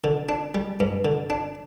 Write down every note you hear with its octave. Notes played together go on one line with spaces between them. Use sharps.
D3
D4
G3
G2
D3
D4